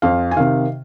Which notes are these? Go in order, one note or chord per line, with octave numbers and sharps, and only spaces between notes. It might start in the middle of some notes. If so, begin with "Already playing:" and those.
F2 F5
G#5
C3 D#3 F5